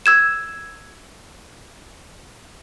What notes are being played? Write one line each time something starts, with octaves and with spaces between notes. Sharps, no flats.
E6 G#6 E7